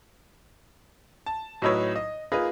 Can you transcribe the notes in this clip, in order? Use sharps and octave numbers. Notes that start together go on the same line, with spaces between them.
A5
A2 F#3 D#4 E4 B4 C#5
D#5
A#3 D#4 F4 G#4 B4 D#5